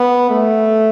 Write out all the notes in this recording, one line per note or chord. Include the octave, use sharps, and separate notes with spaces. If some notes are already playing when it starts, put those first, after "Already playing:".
Already playing: B3
A3